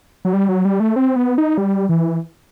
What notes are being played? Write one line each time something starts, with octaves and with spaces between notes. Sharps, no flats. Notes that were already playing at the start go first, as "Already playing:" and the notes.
F#3
G3
F#3
G3
A3
C4
B3
D#4
G3
E3